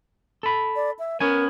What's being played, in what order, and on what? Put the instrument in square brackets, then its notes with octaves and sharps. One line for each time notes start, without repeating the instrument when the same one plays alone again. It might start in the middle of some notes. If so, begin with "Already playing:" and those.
[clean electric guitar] A4 B5
[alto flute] D5
E5
[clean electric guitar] B3 C#4 G#5 [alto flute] A#4